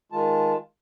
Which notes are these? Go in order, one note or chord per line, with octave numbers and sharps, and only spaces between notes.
D#3 G#3 F4 A5